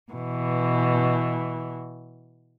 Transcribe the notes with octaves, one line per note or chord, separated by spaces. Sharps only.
B2 E3